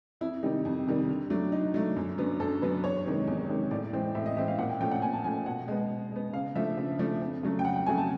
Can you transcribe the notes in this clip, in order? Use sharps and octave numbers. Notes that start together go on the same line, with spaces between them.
F2 E4
C3 D#3 G3 D#4
F2
C3 D#3 G3
D3
F#3 A3 D4
D3 D#4
F#3 A3 D4
F#2
D3 F#3 B3 D4
F#2 A4
D3 F#3 B3 D4 B4
E2 C#5
C3 D#3 G#3
E2
C3 D#3 G#3
A2 D5
E3 G#3 C4
A2 E5
D#5
E3 G#3 C4 E5
F5
A#2 F#5
G5
F3 A3 C#4 G5
F#5
A#2 G#5
A5
F3 A3 C#4 G#5
B2 F#5
G#3 B3
B2
G#3 B3
C#3 F5
F3 A3 D4 E5
C#3
F3 A3 D4
F2
C#3 F#3 A3
G5
F2 F#5
G5
C#3 F#3 A3 G#5
A5